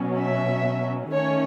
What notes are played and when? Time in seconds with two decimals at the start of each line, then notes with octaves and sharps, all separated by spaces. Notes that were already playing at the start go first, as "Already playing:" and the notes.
Already playing: B2 F#3 C#4
0.18 E5
1.13 D#3 A3 C#4 C#5